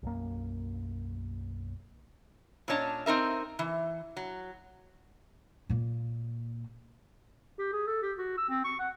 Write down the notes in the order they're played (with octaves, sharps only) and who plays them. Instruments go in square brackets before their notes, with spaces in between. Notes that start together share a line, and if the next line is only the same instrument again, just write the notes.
[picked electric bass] B1 F#2 A#3
[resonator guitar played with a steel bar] A#2 C#4 D4 C#5 D#5 A5
C4 D#4 A#4 E5
E3
F#3
[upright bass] A#2 A#3
[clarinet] G4
G#4
A4
G4
F#4
E6
C4
C#6
F#5